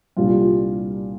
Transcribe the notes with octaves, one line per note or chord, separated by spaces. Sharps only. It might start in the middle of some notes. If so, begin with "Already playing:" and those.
C2 A#2 G3 D4 F4